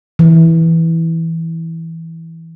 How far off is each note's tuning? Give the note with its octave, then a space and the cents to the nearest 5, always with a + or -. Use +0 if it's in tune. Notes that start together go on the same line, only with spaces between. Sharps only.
E3 -10